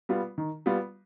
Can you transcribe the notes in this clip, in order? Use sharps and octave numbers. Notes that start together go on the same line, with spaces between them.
G3 B3 F4
D#3
G3 B3 F4